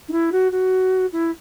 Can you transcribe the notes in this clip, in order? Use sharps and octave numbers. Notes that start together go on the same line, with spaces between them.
D#4
E4
F#4
F#4
E4